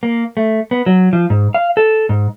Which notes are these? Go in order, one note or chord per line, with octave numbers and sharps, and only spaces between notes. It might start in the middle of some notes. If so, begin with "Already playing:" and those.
A#3
A3
B3
F#3
F3
G#2
F5
A4
G#2